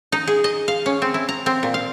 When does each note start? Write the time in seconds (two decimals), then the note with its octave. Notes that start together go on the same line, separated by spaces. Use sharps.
0.12 D#4
0.27 G#4
0.44 D#5
0.68 F5
0.86 C#4
1.02 C4
1.14 E4
1.29 A#5
1.46 C4
1.63 A#2
1.74 F5